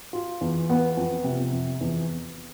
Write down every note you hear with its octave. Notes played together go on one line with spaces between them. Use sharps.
F4
E2
B3
F2
C3
F2
E2